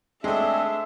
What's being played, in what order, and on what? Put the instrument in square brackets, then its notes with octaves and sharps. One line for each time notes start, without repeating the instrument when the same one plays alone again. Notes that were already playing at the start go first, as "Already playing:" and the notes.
[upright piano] G#3 A3 [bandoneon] C4 D4 G#4 [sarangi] E5